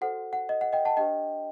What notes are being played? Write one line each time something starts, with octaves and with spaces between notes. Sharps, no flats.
F#4 A4 C5 F#5
F#5
D#5
F#5
D#5 G5
F#5 A5
D4 G4 C5 D#5 G5